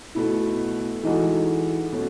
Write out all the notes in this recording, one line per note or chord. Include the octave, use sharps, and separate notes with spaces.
B2 A3 E4
E3 G#3 D#4 F#4 A4
B2 A3 C#4